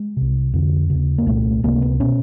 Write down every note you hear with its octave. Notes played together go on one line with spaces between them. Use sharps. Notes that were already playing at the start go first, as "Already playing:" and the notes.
Already playing: G#3
C2 C3
F2 D3
C#3
D#2
A#3
C2 A#2 A3
C#2 C3 A#3
B3
B2 C#4